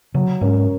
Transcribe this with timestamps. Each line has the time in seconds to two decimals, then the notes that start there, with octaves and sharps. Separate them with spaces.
0.14 C#3 F#3
0.41 G#2 C#4 A#4